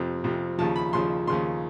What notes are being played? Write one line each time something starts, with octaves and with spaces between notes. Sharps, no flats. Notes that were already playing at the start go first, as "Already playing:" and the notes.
Already playing: F2 C3 F3
F2 C3 F3
D#2 C#3 F3 A5
B5
D#2 C#3 F3 C6
D#2 C#3 F3 C6